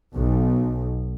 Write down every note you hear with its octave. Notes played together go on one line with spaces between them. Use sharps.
B1